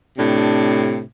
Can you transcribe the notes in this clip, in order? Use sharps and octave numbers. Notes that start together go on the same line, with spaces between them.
A2 C3 D4